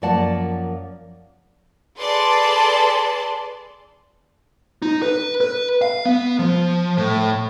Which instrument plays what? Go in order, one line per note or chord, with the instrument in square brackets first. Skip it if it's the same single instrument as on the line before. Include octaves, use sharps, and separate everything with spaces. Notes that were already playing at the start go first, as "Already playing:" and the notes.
[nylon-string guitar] F#2 F3 A#3 D5 F#5 A5
[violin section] G#4 A4 B4 D5 A5 C6
[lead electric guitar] D#4
B4
B4
F5
B3
F3
A2